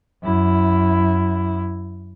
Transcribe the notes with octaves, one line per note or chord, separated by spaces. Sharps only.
F#2 E4